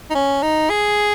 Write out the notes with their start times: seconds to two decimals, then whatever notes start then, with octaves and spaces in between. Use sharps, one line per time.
0.10 D#4
0.15 C#4
0.42 D#4
0.70 G#4